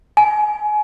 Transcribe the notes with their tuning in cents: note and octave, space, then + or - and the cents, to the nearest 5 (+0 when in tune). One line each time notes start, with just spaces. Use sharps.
G#5 +25